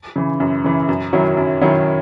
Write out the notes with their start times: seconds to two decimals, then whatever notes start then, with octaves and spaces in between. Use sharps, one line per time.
0.16 C#3 E3
0.40 F#2
0.64 C#3 E3
0.89 F#2
1.13 D#3 F#3 C#4 E4
1.37 F#2
1.61 D#3 F#3 C#4 E4